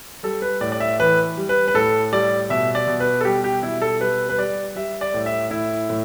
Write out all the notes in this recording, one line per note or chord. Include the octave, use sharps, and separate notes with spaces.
G3 A4
B4
A2 D5
D5
E5
E3 B4
G3
B4
B4
A2 A4
G3 D5
B2 E5
D5
B2
B4
A4
G3 G4
G4
B2 E4
A4
G3 B4
B4
G3 D5
G3 E5
D5
A2
E5
A2 E4
A2